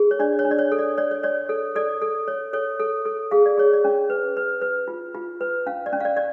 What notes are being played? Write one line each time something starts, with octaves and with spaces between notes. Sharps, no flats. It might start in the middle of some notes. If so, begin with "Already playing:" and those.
Already playing: G#4
C#5
D4 D5
C#5
D4
D5
C#5
A4
D5
C#5 D5
C#5
C#5 D5
A4
A4 D5
A4
C#5
A4 C#5
A4
A4
G#4 F5
D5
G#4 C#5
D5
C#4
B4
B4
B4
F4
F4
B4
C#4 F5
D5
C#4
F5
D5
D5